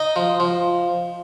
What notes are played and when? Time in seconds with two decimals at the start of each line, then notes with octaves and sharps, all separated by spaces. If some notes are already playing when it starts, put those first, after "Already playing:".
Already playing: D#4 D#5
0.16 F3
0.40 F3